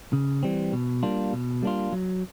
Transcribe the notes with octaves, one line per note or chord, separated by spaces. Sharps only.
C#3
E3 G3 C4
B2
G3 A#3 D4 F4
B2
G3 A#3 D4 F4
F#3